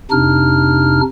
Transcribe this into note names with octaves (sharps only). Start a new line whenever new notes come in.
F2 C3 D4 D#4 F6